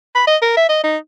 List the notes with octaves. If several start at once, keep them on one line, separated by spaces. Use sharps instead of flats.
B5
D#5
A#4
E5
D#5
D#4